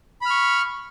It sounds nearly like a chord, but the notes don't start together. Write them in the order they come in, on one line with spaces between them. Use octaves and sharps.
B5 F6 C#6